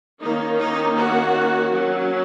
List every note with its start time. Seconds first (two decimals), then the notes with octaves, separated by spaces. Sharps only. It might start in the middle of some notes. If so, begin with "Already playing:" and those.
0.21 D#3 A#3 C#4 D#4
0.59 D#4
0.97 F#4
1.73 F#3 C#4